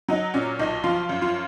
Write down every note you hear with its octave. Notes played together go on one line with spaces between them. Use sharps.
F#3 D#4
A#2 C#4
B1 D#4
F3 F4
F#2
F4